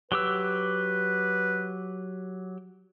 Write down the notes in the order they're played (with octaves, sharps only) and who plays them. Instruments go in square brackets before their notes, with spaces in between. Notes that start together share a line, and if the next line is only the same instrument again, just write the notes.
[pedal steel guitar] F#3 G4 E6 [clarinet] B4